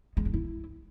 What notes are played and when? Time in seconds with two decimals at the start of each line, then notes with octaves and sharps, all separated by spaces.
0.17 G#3
0.25 D4
0.34 E4